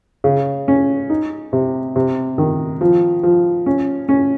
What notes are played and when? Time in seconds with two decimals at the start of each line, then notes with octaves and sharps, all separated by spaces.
0.24 C#3
0.68 C#4
1.10 D#4
1.53 C3
1.96 C3
2.38 D#3
2.81 F3
3.23 F3
3.66 C#4
4.09 C#4